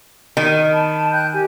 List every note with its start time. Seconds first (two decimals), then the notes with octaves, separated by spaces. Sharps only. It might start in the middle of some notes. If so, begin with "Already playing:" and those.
0.37 D#3
0.72 A5 B5
1.13 G5 F#6 G6
1.32 G4 G#5